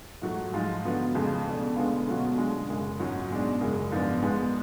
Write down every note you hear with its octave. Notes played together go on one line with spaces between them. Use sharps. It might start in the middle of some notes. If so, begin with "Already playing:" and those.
G#2 F#3 A3
G#2 F3 G#3
D3 F#3 B3 F4
F2 C#3 F3 G#3
B2 A3 D4
D3 G#3 B3 F4
B2 F#3 A3 C#4 F4
D3 G#3 D4
F#2 C#3 G#3
G#2 F#3 C#4
B2 G#3 D4
F#2 C#3 G#3
G#2 F3 B3 D4
G#2 G#3 B3